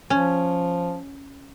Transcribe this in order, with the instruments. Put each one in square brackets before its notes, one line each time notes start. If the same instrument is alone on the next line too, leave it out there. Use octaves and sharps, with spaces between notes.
[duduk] F3 [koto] C#4